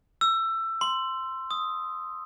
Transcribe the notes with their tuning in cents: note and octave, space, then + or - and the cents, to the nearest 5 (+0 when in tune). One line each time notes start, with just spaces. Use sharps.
E6 +20
C6 -5
D#6 +5